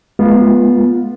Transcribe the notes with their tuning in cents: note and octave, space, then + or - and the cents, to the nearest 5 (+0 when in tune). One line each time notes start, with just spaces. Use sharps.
G#3 +35 B3 -20 F4 +0